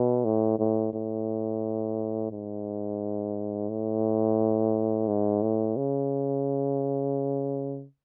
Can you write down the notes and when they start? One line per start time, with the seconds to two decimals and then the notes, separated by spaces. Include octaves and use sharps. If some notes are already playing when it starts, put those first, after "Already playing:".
Already playing: B2
0.25 A2
0.59 A2
0.93 A2
2.31 G#2
3.69 A2
5.07 G#2
5.42 A2
5.77 C#3